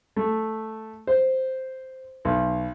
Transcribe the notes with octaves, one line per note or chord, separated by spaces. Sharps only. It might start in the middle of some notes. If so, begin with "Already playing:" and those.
A3
C5
B1